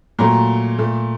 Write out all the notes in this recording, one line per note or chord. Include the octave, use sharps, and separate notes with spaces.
A#2 F#3 A3 A#5
A#2 A3